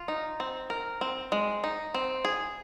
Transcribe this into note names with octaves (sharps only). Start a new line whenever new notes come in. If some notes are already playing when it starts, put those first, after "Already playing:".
Already playing: F4
D#4
C4
A#4
C4
G#3
D#4
C4
G#4